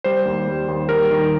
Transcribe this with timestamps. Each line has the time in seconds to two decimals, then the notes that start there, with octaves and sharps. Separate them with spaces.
0.04 G3 C5
0.25 D#2
0.48 G3
0.68 D#2
0.89 G3 A#4
1.11 D#3